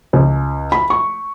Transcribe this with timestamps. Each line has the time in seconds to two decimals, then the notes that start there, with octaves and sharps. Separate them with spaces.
0.13 C#2
0.72 B5
0.90 C#6